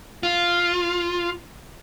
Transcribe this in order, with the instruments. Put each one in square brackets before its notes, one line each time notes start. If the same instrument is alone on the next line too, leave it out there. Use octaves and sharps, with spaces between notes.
[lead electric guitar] F4